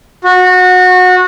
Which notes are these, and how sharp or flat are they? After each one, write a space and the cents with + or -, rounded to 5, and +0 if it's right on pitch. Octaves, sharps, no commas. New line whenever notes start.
F#4 -20